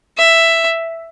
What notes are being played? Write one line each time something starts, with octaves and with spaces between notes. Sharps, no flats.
E5